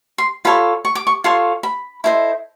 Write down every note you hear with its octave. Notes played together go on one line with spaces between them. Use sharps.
C6
F4 A4 C#5 B5
C#6
D6
C#6
F4 A4 C#5 C6
B5
E4 A4 C5 D#5